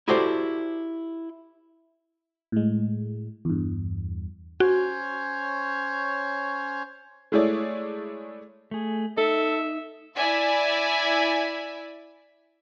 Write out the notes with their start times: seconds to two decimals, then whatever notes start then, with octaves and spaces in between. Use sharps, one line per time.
0.08 E4 F#4 G4 A4 C5 D5
2.52 A2 G#3
3.45 E2 G2
4.60 C#4 F#4 C5 C#5
7.32 G#3 A3 E4 G#4 C#5 D5
8.71 A3 G#4
9.17 D#4 A4 E5
10.16 E4 D5 E5 G#5